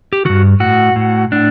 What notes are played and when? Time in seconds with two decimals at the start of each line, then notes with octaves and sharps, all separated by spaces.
0.13 G4
0.25 G2 D#3 F#4
0.60 A2 F#4
0.96 A2
1.32 A2 D4